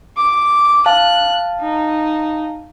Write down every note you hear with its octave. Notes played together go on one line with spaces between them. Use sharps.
D6
F5 A5 F#6
D#4